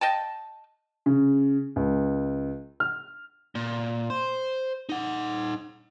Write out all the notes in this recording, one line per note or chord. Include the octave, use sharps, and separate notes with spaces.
D#5 G5 A5
C#3
C#2
F6
A#2
C5
D#4 F#5